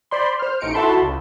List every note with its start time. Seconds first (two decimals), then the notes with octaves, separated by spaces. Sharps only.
0.11 C5 D5 B5 C6
0.39 C5 F6
0.61 A1 D#4 C#7 D7
0.74 E4 F#4 A4 A5 B5 C6
1.02 C#2